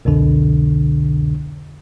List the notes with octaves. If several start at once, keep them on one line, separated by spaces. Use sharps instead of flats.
C2 F2 B2 D3